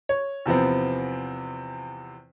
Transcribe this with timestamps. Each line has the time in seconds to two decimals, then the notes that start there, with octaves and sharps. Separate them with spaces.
0.09 C#5
0.46 E2 C3 F3 B3 C4